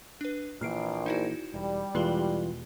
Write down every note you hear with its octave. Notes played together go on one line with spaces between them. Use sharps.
D4 B4
A#1 A#2 E3 F6 C7 D7
D#4 E4 F#4
E1 G3
E2 B2 E3 G#3 F4 G#4 G7